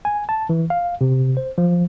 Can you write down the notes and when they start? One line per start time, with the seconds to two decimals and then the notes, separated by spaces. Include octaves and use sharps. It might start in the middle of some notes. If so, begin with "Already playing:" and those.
0.05 G#5
0.29 A5
0.49 E3
0.70 F5
1.01 C3
1.37 C5
1.58 F3